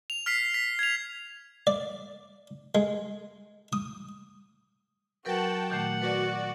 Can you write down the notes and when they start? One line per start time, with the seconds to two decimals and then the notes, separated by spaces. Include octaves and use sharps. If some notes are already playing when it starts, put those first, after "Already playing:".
0.10 F7
0.26 F6 B6 C7
0.54 B6
0.79 G#6 F7
1.67 D5
2.75 G#3
3.73 D#6
5.25 F#3 F#4 A#4 B4 F#5 G5 A5
5.70 A#2 D#3 A3 F#5
6.01 F#4 B4 D5